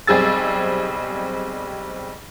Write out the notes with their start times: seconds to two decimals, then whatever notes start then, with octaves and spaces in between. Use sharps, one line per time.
0.07 B1 G3 C4 G#4 E6 A6